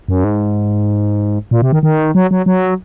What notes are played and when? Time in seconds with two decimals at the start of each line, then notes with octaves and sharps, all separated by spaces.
0.09 F#2
0.24 G#2
1.51 A#2
1.62 C3
1.72 D#3
1.83 D#3
2.15 F#3
2.31 F#3
2.46 F#3